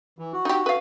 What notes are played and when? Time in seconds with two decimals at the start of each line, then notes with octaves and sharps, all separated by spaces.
0.19 E3
0.33 F#4
0.45 D#4 G4
0.66 B4 F5